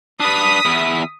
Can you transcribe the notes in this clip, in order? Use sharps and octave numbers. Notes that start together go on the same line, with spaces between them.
D4 B4 D#6 B6
E2 E4